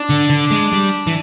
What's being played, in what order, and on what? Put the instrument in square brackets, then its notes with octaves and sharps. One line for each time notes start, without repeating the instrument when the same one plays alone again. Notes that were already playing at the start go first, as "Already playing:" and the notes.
Already playing: [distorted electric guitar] D4
[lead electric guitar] D3
D3
G#3
G3
E3